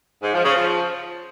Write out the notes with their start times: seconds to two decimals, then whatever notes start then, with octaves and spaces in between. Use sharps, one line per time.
0.22 G#2
0.34 F3
0.45 C#3
0.56 F3